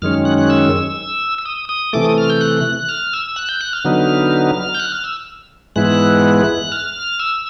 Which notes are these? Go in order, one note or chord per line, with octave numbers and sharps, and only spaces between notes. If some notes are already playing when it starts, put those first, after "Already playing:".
F#2 D#3 G#3 C#4 F6
F#6
F#6
E6
E6
D#6
D#6
C3 E3 A3 D6
D#6
F6
G6
F#6
F6
E6
F#6
G6
F#6
F6
D3 F#3 B3 D#4
G6
F#6
F6
E6
G#2 E3 G#3 B3 E4 F#6
F6
E6